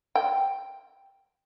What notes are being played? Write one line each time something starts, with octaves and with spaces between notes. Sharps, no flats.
G5